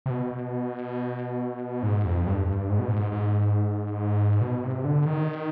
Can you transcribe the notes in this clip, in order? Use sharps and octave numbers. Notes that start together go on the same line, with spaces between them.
C3
B2
G#2
F2
G2
G2
G#2
B2
G#2
G#2
B2
C3
D3
D#3